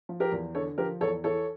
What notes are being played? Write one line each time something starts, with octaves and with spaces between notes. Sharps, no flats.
F3
G4 A#4
E2
D3 A4 C#5
F3 G4 A#4
E2 A4 C#5
E3 A4 C#5